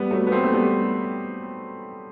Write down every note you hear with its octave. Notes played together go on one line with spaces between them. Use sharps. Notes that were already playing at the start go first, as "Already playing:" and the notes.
Already playing: G3 B3
F#3 A3
B3
A3 C4
A3
G3 B3